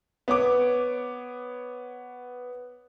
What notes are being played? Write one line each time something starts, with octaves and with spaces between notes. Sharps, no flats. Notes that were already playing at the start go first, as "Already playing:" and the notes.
B3 C#5 D6